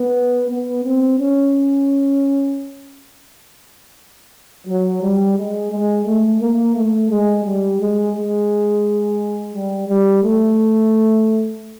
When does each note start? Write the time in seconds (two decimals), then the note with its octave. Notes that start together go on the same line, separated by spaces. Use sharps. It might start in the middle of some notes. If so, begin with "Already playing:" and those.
Already playing: B3
0.49 B3
0.84 C4
1.18 C#4
4.66 F#3
5.01 G3
5.36 G#3
5.71 G#3
6.06 A3
6.40 A#3
6.75 A3
7.10 G#3
7.44 G3
7.79 G#3
8.15 G#3
9.54 G3
9.88 G3
10.23 A3